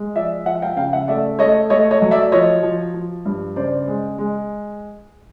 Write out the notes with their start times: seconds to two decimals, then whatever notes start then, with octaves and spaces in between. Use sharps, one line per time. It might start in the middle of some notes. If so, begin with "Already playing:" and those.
Already playing: G#3
0.15 F3 D5 E5
0.46 F3 E5 F#5
0.62 F5 G5
0.77 C#3 F5 G5
0.93 E5 F#5
1.08 A3 D5 E5
1.39 A3 C#5 D#5
1.70 A3 C#5 D#5
1.91 C#5 D#5
2.02 F#3
2.11 D5 E5
2.32 F3 C#5 D#5
2.63 F3
2.94 F3
3.25 G2
3.56 C#3 C5 D5
3.88 G#3
4.18 G#3